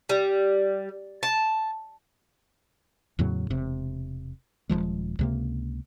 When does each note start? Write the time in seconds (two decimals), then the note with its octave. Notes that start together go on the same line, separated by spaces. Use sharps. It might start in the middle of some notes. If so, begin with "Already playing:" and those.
0.09 G3
1.23 A5
3.19 E2 A2 C#3 F#3
3.50 E1 C3
4.69 D#1 E2 F3 G#3
5.19 C#2 C3 A#3